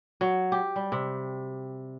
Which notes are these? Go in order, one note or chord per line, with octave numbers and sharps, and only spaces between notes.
F#3
G4
G3
C3